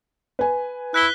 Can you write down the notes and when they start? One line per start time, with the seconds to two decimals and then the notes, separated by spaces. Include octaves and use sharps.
0.39 B4 G#5
0.94 E4 F#6 B6 G7